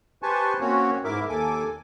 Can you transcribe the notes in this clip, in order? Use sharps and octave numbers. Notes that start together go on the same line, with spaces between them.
G4 B4 C5 G#5 A5 C#6
A#3 C4 C#4 F#4 C#5
G#2 E3 E4 A#4 E5 D6
D#2 A#3 A4 G#5 D6